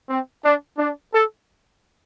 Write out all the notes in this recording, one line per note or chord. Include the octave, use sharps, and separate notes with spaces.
C4
D4
D4
A4